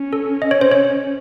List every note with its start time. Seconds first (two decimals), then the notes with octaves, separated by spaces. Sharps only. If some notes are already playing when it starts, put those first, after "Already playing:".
Already playing: C#4
0.13 A4
0.42 D#5
0.51 C#5
0.61 C5
0.71 C#5